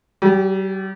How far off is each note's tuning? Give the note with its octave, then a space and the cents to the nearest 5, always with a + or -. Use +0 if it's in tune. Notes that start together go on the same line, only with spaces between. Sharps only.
G3 -45 G4 +25